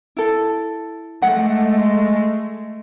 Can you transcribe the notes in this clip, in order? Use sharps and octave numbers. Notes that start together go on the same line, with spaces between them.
E4 A4
G#3 A3 F#5